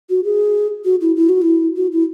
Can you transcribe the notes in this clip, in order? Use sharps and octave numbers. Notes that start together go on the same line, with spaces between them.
F#4
G#4
F#4
E4
E4
F#4
E4
F#4
E4